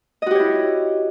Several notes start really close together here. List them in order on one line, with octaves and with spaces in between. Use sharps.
D#5 F#4 G4 C#5 E4